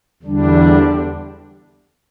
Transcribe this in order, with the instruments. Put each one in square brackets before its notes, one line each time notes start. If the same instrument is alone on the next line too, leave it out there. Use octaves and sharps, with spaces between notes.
[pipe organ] E2 D3 G3 D4